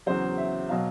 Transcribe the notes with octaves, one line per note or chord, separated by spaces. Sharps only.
E2 C#3 F#3 C5
E5
B2 F#3 F5